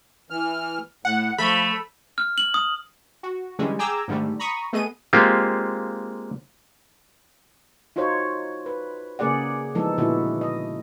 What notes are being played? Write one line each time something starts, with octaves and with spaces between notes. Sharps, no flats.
E3 F6
A2 F#5
F3 A3 B5
F6
F#7
D#6
F#4
D3 E3 G3 G#3 C#4
G#4 G5 G#5 A#5 D6 E6
G#2 D3 D#3 G3 A3
A#5 B5 C#6 D#6
A3 B3 G#4 D#5 D#7
G#3 A#3 C4 F4 G4
D#4 F4 F#4 C5 C#5
B4
C#3 A#3 G#4 D5 F#5
E3 F3 G#3 B3 D#4 A4
A#2 D3 B3 E4 F#4
D#5